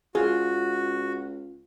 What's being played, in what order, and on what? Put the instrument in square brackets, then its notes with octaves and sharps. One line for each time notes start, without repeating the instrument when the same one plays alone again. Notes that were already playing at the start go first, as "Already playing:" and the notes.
[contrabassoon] C#2 [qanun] F4 [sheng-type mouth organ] F#4 [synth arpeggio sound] G#4